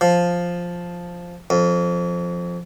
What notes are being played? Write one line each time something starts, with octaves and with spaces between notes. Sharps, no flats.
F3
F2